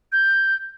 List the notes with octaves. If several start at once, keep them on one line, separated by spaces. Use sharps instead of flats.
G6